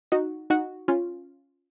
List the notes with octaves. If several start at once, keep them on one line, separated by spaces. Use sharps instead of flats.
D#4 F#4
D#4 F#4
C#4 F4